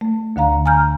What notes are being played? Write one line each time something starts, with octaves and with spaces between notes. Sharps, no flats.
A3
D2 D3 F5 A#5
G#5 A#5 F6 G6